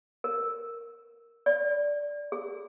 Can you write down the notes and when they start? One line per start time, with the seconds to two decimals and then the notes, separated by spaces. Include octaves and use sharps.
0.24 A#4
1.46 D5
2.32 G#4